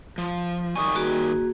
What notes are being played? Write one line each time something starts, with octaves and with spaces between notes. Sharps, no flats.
F3
D#3 G3 G#5 C#6 D#6
A#3 F#4 G#4